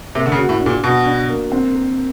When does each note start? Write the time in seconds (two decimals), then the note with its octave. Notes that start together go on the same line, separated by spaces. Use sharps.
0.15 C3 A#3
0.26 D3
0.32 C#3
0.38 F#4
0.49 A2
0.61 D4
0.66 A#2
0.84 B2 F#4
1.06 D4
1.30 A#3
1.52 C4
1.75 A#4